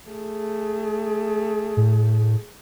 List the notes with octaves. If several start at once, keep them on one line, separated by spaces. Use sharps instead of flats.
A3 G#4
A2